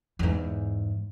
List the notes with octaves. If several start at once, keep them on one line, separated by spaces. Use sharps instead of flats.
E2 G#2